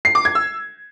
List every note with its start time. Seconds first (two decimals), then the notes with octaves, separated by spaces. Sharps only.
0.05 C7
0.15 D6
0.25 G#6
0.35 E6